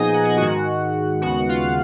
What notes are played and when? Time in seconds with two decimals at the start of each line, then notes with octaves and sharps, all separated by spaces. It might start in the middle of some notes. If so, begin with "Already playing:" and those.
Already playing: A#2 F3 B3 D#4 G#4 D#5 G#5
0.14 F#5
0.25 G#5
0.37 G#2 D#3 G#3 F#4 F#5
1.22 D#2 C#3 G#3 B3 F#4 F#5
1.49 F4 F5